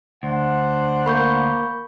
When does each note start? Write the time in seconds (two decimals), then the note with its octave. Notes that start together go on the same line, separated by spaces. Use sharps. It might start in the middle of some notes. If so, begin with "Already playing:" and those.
0.23 D2 D4 C5 F#5
1.06 A#3 B5 C#6 G6